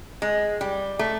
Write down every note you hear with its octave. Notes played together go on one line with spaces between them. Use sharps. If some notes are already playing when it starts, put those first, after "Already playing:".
G#3
G3
A3